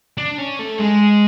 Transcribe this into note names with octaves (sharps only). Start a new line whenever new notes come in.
D4
C#4
A3
G#3